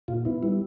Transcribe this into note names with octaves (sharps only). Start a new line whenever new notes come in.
A#2 F4
B3 E4
G3 E4